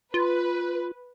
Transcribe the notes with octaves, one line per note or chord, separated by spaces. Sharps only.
F4 B4